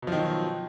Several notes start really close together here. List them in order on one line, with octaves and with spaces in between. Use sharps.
B2 F3 D#3 F#3